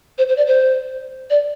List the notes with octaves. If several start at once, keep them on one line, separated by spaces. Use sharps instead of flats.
C5
C5
D5
C5
D5